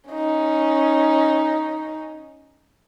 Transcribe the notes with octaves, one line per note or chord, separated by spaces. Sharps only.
C#4 D#4